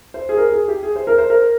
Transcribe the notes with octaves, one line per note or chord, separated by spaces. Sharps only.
C5
G#4
A#4
G#4
G4
G#4
C5
A#4
C5
A#4